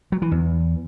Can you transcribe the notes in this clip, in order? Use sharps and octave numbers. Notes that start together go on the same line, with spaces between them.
F#3
E3
E2